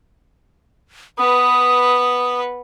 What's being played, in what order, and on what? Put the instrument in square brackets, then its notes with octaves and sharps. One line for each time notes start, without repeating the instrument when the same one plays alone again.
[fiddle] B3 B4 [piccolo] D#6